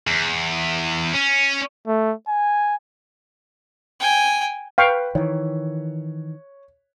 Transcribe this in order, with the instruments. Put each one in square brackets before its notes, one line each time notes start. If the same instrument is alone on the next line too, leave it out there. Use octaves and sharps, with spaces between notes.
[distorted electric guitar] E2
C#4
[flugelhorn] A3
G#5
[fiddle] G5 G#5
[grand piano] B4 [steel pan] F5 G5 C#6
[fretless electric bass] D#3 E3 [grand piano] C#5